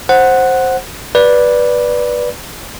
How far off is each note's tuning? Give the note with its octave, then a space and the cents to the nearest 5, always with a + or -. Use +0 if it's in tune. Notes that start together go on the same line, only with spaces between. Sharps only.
C5 +10 F#5 +0
B4 -10 D5 +0